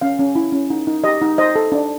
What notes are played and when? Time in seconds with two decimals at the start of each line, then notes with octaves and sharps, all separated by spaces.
0.02 C#4 F5
0.19 C#4
0.36 E4
0.52 C#4
0.70 D#4
0.87 D#4
1.04 G4 D#5
1.21 D#4
1.38 C5 D#5
1.56 A4
1.72 D4